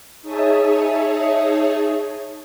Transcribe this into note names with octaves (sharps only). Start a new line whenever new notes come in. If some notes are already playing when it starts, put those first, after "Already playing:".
D#4 G#4 C#5 E5 A5 D#6